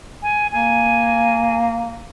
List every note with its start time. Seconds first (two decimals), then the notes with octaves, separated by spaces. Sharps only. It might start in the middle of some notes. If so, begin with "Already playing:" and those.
0.22 G#5
0.52 A#3 G#5